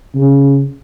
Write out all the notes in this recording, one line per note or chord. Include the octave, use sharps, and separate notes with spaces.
C#3